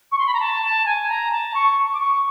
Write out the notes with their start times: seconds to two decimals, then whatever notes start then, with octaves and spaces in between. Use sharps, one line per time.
0.12 C#6
0.18 C6
0.26 B5
0.33 A#5
0.40 A5
0.62 A5
0.86 G#5
1.08 A#5
1.31 A5
1.54 C#6
1.93 D6
2.00 C#6